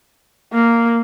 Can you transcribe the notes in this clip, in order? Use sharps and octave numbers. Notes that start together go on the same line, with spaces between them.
A#3